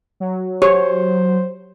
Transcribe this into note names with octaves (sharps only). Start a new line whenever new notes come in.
F#3
G4 C5 C#5